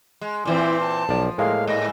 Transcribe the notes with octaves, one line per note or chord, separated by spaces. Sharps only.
G#3
A#2 E3 C4 E4
A5
B1 F3 D5
A2 G#3 A#3 F5
G#2 D#5